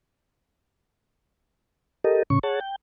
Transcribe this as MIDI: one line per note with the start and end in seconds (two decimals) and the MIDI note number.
2.04 2.23 67
2.04 2.23 69
2.04 2.23 70
2.04 2.23 75
2.30 2.39 45
2.30 2.39 49
2.30 2.39 61
2.30 2.39 85
2.43 2.60 68
2.43 2.60 73
2.43 2.60 78
2.43 2.60 81
2.60 2.76 79